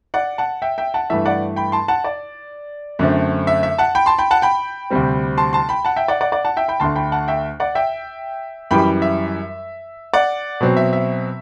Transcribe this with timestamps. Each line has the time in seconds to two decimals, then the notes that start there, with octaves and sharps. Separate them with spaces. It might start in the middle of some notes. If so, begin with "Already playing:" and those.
0.14 D5 F#5
0.38 F#5 A5
0.62 E5 G5
0.78 E5 G5
0.94 F#5 A5
1.10 G2 E3 A3 E5
1.25 D5 F#5
1.56 G5 B5
1.72 A5 C6
1.88 F#5 A5
2.04 D5
2.99 F#2 D3 A3 C4
3.47 E5
3.63 E5
3.78 F#5 A5
3.95 G5 B5
4.06 A5 C6
4.18 G5 B5
4.31 F#5 A5
4.42 G5 B5
4.90 D2 C3 G3 C4
5.38 A5 C6
5.53 A5 C6
5.69 G5 B5
5.85 F#5 A5
5.96 E5 G5
6.08 D5 F#5
6.21 D5 F#5
6.32 D5 F#5
6.45 F#5 A5
6.57 E5 G5
6.68 G5 B5
6.80 D2 D3 A3 A5 C6
6.96 G5 B5
7.12 F#5 A5
7.28 E5 G5
7.60 D5 F#5
7.75 E5 G5
8.71 F#2 E3 G3 G5 B5
9.02 E5
10.14 D5 F#5
10.61 B2 F#3 C4
10.77 E5
10.93 E5